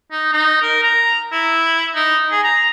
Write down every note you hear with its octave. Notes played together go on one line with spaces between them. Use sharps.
D#4
D#4
A#4
A#5
E4
D#4
G#4
A#5